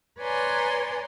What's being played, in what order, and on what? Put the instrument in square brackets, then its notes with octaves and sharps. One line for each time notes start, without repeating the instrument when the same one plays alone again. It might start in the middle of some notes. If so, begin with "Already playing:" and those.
[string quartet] B4 C#5 D5 G#5 A#5 C6